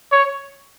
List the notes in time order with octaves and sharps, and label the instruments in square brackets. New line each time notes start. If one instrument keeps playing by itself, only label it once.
[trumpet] C#5